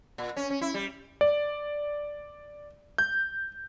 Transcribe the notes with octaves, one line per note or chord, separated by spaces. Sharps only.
A#2
C#4
C#4
E4
G3
D5
G6